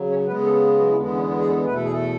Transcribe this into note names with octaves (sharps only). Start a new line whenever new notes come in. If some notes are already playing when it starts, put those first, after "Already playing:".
Already playing: C#3 F#3
C#4 C#5
C#3 G#3 B3 B4
A3 A4
F#3 F#4
E4
E2 D3 G#3 B3 D4
C#4
G#4
A3 A4
E2 B2 A3 B4
A4
G#4
A3 A4